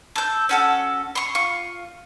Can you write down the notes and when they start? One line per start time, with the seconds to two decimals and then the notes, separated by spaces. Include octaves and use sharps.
0.16 A4 G6
0.49 C#4 F#4 A4
1.15 C6 C#6
1.35 F4 C#6